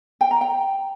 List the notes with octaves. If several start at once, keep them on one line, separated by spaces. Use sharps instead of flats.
G5
A#5
G5